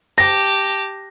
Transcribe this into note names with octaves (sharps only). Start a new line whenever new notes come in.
G4 A5 A#6